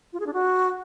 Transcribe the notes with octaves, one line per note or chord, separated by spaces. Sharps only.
F4
G#4
D4
F#4